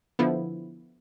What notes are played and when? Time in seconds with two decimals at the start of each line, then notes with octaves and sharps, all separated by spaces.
0.19 D3 F3 B3 E4